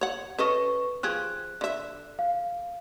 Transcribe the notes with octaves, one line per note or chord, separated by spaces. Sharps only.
C#5 F#5
C#4 A4 B4 D#5 C#6
F3 G4 G#4 F#6
D3 E5
F5